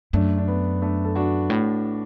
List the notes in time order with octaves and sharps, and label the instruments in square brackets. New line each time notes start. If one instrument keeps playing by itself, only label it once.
[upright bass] F#2 [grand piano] A3 D4
[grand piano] D4
B3
A3 D4
A4
D4 F#4
[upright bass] A2